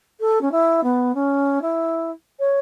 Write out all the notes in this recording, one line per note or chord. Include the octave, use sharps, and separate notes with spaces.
A4
C#4
E4
B3
C#4
E4
C#5